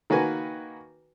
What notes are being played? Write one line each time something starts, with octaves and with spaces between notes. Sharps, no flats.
D#3 A#3 F#4 B4 G#5